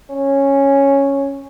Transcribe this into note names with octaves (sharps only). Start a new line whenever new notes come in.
C#4